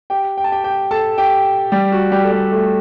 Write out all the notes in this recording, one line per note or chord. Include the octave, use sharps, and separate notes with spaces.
G4 G5
G5
A5
G4 G5
G4 G5
A4 A5
G4 G5
G3 G4
F#4
G3 G4
A4
G3 G4
A3 A4